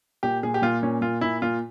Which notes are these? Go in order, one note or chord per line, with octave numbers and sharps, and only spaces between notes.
A#2 G4
A#2 G#4
G4
A#2 F4
A#2 C#4
A#2 F4
A#2 E4
A#2 F4